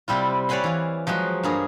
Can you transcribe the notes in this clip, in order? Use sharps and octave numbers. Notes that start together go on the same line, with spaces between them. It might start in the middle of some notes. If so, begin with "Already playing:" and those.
C3 G3 E4 F4
C#5 D5 F#5 G#5 B5 C6
E3 F5
F3 F#3 G#3 F#4
G2 A#3 G#4